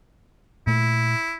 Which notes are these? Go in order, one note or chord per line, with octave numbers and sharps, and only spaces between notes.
A#2 A3 E4